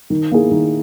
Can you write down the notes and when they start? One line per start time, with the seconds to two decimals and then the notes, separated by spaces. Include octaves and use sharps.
0.10 D#3
0.31 A#3 E4 G#4
0.51 D#3